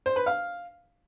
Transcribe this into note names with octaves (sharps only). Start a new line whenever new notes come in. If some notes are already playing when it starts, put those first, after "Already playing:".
C5
B4
F5